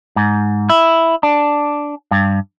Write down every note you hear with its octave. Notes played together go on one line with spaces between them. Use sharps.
G#2
E4
D4
G2